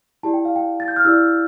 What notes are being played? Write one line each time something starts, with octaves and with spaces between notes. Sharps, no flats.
E4 G4 D5 A5
G5
F5
G5
A6
G6
F6
E4 G4 D5 E6